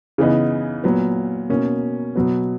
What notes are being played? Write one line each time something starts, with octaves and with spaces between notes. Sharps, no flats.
C#3 E3 B3 D#4
A#2 F#3 B3
B2 A#3 C#4
B2 F#3 B3